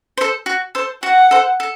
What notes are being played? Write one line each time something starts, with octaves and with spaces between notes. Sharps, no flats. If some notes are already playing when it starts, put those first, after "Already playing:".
A4 C5
F#4
A4 C5
F#4 F#5
A4 C5
A4